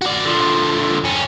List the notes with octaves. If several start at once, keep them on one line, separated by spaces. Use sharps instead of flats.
F#4 D5
D3 F3
F2 C#4